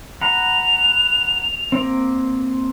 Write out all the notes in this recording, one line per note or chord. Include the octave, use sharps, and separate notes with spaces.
F#5 A#5 B5 F7
A#3 C4